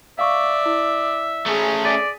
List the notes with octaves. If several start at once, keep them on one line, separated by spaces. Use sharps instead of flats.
D5 E5 F5 C#6 D#6
E4
A3 C#4 G#4
D5 A6 B6 D#7